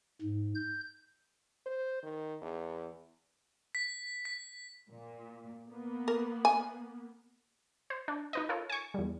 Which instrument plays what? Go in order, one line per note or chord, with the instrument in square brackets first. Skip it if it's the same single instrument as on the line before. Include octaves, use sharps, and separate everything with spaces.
[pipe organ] G#2
G6
[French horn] C5
D#3
E2
[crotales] B6
B6
[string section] A#2
A#3 B3
[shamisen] A#4
G#5
[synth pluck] C5
D4
D#4 B4 D#5
F4 A4 A#4 C#5
G#5 C#6
E2 G3